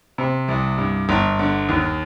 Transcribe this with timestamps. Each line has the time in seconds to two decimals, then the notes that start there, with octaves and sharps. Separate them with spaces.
0.18 C3
0.48 C2
0.78 G2
1.09 G1
1.39 D3
1.69 D#2